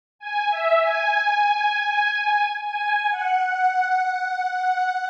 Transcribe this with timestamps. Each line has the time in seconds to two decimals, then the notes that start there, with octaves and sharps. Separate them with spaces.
0.19 G#5
0.50 E5
0.80 G#5
2.64 G#5
3.10 F#5